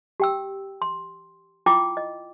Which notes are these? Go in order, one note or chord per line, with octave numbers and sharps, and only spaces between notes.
G4 G5 E6
C6
E4 F4 G5 D6
D#5